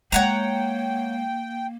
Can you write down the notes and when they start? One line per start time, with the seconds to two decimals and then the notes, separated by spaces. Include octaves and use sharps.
0.12 G#3 A#3 C#5 F#5 G5 A#5